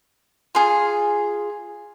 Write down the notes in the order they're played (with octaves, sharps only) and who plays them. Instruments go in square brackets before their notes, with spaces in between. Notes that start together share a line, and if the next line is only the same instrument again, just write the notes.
[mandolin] F4 G#4